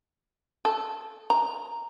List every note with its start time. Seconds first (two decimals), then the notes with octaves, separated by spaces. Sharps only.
0.65 A4
1.30 A#5